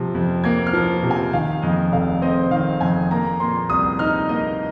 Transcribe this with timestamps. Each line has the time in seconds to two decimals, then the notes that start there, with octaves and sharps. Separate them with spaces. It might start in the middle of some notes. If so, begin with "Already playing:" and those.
Already playing: C3 F3
0.15 F2
0.44 A#3 G#6
0.67 F6
0.73 F3
1.03 C3
1.11 G#5
1.33 D#3 F5
1.62 F2 D#5
1.92 F1 F5
2.22 C4 D#5
2.51 D#3 F5
2.81 F2 G#5
3.11 A#3 A#5
3.40 A#2 C6
3.70 C2 D#6
3.99 D#4 F6
4.29 A#3 D#5